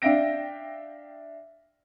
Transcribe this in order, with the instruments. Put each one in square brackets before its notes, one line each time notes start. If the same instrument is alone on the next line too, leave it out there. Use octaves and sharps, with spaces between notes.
[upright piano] D4 E5 F5 G5 A#6 D7